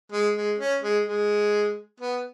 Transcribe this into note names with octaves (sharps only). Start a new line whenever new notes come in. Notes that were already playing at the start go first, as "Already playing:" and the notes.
G#3
G#3
C#4
G#3
G#3
B3